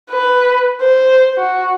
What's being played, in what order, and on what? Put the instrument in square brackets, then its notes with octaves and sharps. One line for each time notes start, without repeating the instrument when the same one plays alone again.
[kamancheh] B4
C5
F#4